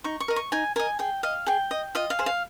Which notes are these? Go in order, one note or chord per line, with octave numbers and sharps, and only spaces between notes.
D#4 C#6
C#6
A#4 D#5
C#6
D#4 G#5
A#4 D#5 G#5
G#4 G5
D#5 F5
G#4 G5
D#5
F4 D#5
F5
G#4 C5
F5